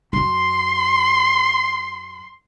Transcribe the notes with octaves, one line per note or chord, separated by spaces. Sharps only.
F#2 C6